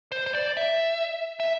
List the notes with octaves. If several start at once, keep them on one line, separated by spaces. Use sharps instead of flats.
C5
C5
D5
E5
E5